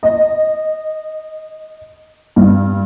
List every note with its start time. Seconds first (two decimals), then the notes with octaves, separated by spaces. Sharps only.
0.03 D#5
2.36 G2